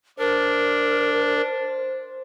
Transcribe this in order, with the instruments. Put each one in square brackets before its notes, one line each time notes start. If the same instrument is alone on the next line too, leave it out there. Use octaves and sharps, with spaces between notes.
[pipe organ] D4 [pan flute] A#4 [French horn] C5